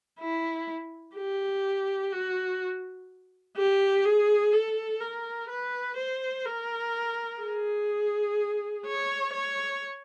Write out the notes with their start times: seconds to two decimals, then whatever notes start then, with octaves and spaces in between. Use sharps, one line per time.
0.20 E4
1.15 G4
2.12 F#4
3.57 G4
4.05 G#4
4.52 A4
5.01 A#4
5.49 B4
5.97 C5
6.45 A#4
7.41 G#4
8.86 C#5
9.33 C#5